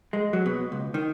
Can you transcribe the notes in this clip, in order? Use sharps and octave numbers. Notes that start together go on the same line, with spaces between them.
G#3
F#3
B2
C#2
D#3